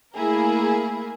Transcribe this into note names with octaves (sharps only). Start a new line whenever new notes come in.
A3 A#3 E4 G#4 A#4